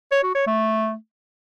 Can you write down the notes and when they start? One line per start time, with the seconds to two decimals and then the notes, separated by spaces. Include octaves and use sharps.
0.12 C#5
0.23 F#4
0.35 C#5
0.47 A3